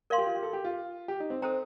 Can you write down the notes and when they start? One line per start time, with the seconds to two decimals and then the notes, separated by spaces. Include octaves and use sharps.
0.10 A#4 D5 F5 C6
0.18 G4
0.26 F4
0.35 G4
0.43 A4
0.53 G4
0.64 F4
1.08 G4
1.20 D#4
1.30 C4
1.42 C4 A4 C5 G5 A#5